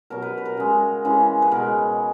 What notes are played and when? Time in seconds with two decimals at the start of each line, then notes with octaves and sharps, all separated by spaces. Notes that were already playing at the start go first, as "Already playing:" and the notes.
0.10 B2 F#3 A#4
0.22 B4
0.37 B4
0.45 A#4
0.57 C#3 G#3
1.05 C#3 E3 G#3
1.42 B4
1.51 B2 G#3 A#4